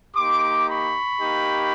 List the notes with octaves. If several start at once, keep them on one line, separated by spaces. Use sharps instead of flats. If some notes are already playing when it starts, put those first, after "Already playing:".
A#3 D#4 G4 C6 D6
B5 C#6
A#3 D#4 G4